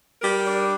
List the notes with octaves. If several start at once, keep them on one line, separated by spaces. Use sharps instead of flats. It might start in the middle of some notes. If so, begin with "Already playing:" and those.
G3 A#4
D4